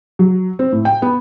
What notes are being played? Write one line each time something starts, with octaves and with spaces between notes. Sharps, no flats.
F#3
C4
A2
G5
B3